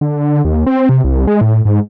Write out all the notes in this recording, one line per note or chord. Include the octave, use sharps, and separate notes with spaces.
D3
D#2
C4
C3
C2
G#3
A2
G#2